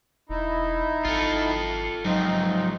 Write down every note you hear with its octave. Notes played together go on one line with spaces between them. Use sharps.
E1 D#4 E4
G#1 F4 A4
G#2 F3 F#3 C4 D#4 F4